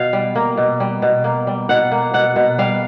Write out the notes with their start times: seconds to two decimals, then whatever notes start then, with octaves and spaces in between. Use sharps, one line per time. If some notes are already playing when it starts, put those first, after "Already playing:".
Already playing: B2 F5
0.13 G3
0.35 A#3
0.57 B2
0.80 G3
1.02 B2
1.24 A#3
1.47 G3
1.69 B2 F#5
1.91 A#3
2.14 B2 F#5
2.36 B2
2.58 G3 F5